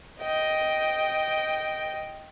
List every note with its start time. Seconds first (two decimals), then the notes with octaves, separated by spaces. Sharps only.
0.20 D#5 G5